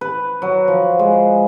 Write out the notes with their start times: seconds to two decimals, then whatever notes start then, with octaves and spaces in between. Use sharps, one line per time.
0.01 B4
0.42 F#3
0.68 F3
0.99 G#3